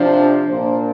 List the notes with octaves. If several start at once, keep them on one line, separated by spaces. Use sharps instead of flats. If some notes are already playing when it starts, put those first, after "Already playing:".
Already playing: C3 F3 D4
G4
A#2 A#3 D4 C5